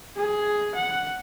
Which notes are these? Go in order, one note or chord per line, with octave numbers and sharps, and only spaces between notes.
G#4
F#5